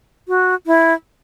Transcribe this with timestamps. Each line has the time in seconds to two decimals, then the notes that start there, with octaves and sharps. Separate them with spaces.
0.28 F#4
0.67 E4